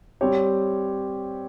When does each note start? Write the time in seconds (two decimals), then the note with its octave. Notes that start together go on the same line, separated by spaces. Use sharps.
0.21 G3 C4 G4 C#5